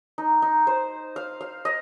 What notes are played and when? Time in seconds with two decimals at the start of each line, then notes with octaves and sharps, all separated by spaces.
0.18 D#4
0.42 D#4
0.67 C5
1.16 F5
1.41 F5
1.65 D#5